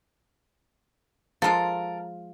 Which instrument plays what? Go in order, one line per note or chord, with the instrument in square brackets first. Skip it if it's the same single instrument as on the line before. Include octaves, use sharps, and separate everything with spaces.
[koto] F3 G#3 F4 [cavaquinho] A4 A#4